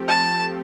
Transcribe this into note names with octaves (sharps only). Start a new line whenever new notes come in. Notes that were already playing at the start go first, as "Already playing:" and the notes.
Already playing: F3 A3 C4 G4
A5